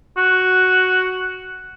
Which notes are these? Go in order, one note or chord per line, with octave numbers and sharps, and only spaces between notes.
F#4